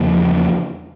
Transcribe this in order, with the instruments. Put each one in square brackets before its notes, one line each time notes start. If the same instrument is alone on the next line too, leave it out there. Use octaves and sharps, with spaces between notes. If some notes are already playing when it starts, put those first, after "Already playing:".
Already playing: [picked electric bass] E2 C#3 F3 A#3